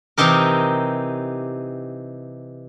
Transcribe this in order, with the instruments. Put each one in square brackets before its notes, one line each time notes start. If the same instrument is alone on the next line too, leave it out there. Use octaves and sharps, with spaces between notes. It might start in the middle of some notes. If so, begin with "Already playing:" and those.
[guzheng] C3 E3 D#4 G4 A#4